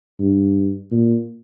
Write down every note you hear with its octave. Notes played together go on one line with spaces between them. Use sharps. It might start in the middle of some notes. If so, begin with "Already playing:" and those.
G2
A#2